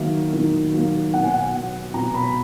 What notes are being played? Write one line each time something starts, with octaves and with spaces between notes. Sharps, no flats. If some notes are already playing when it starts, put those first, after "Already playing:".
Already playing: D#3 F#3 A#3 E5
D#3
F#3 A#3
B2 F#5
G#5
F#5
F#3 B3
B2 A#5
B5